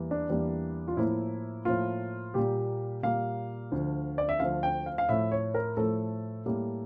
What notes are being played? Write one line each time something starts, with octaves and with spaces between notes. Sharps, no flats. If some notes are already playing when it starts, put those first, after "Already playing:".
Already playing: E2 E3 G3 A#3
D4
E2 E3 G3 A#3
F4
A2 F3 A#3 E4
A2 F3 A#3 F4
A#2 G3 A#3 G4
A#2 G3 A#3 F5
D2 D3 F3
D5
E5
D2 D3 F3 F5
G5
F5
F5
A2 F3 A3 E5
C#5
A#4
A2 F3 A3 A4
A2 G3 A#3